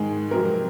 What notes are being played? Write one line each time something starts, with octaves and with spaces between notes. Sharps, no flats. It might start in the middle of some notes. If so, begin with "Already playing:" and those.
Already playing: G#2 D#3 G#3 G#4
F2 C3 F#3 A#4